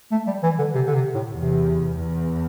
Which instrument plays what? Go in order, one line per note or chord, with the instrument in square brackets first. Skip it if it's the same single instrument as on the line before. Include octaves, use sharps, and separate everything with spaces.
[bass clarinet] A3
G3
E3
D3
C3
D3
C3
A2
[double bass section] E2 [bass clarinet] C3
[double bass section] E2